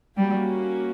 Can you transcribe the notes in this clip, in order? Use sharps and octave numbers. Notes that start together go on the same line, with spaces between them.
G3 A#3 C#4 F#4